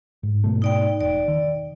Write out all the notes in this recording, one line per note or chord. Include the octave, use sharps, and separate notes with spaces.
G#2
G#2 B2 A3
D#4 D5 G5
E1 D5
D#3